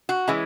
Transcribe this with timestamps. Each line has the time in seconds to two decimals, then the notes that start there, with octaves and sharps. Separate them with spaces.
0.09 F#4
0.28 E3 G#3 C#4 E4